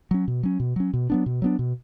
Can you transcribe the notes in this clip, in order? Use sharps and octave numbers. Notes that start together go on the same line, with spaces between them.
F#3 C#4
B2
F#3 C#4
B2
F#3 C#4
B2
F#3 B3 D4
B2
F#3 B3 D4
B2